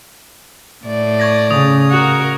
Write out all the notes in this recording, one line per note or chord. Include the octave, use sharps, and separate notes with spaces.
A2 D5
C#6 G#6 A#6
C#3 D#6 F7
F#4 A#4